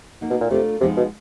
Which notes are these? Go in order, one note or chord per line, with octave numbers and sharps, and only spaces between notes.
A#3 D#4 F#4
B2
A#2
C3 A3 D4 F4 A#4
C3 F3 G#3 B3 D#4
B2